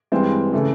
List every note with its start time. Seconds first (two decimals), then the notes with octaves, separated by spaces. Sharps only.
0.12 G2 E3 G#3 C4
0.53 C#3 E3 A3